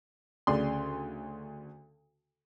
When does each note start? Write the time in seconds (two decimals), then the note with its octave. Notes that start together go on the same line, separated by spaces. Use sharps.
0.47 D2 C#3 D5 C6